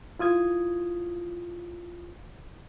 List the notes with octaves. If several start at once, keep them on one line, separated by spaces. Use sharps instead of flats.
E4 F4 D#6 G#6